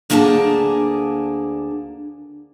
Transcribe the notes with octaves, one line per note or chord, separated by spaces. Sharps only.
D2 A#3 D4 G#4 G5 A5